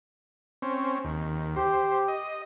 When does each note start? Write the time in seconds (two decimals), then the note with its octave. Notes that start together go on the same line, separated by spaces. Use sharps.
0.62 C4 C#4
1.04 D#2
1.56 G4 C5
2.08 D#5